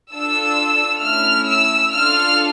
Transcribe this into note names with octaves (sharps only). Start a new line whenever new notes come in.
D4 F4 A4 E6
A3 C#4 E4 F6
E6
D4 F4 A4 F6